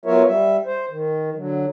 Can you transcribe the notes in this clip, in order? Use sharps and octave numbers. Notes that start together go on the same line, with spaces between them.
F#3 B3 F4 A#4 C#5 E5
G3 E5
C5
D#3
D3 F#3